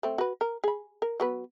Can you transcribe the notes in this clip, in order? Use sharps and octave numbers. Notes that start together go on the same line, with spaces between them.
A3 C4
F#4 B4
A#4
G#4 B5
A#4
F#3 B3 B4